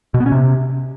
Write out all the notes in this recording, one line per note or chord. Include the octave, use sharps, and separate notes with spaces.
B2
B3
C#4
C3